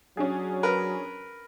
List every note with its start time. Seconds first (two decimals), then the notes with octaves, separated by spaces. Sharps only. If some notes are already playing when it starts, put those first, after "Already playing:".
0.17 F#3 C#4 D4 G#4
0.63 A#4 B4